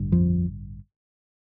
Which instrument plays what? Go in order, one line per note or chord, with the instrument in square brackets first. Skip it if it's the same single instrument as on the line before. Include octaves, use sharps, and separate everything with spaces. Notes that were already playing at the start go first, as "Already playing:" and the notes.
Already playing: [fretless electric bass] A1 G2 D3
F2 F3